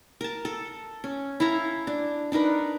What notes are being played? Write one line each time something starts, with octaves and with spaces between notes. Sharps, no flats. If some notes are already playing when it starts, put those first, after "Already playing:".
A#4 A5
A4
C#4
E4 A4 F5 A#5
D4
D4 D#4 A#4 B4